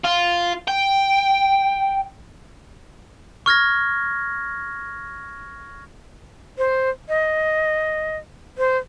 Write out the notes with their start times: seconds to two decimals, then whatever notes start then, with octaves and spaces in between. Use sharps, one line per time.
0.05 F4
0.68 G5
3.46 C#6 F6 G#6 A#6
6.58 C5
7.09 D#5
8.58 C5